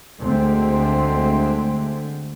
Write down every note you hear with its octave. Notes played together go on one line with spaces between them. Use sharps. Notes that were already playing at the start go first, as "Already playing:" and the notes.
D2 D3 G#3 A3 C4